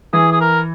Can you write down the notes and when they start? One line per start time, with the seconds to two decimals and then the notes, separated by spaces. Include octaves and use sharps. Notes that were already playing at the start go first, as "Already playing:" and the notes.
0.13 E3 G#4
0.32 G#4
0.40 A#4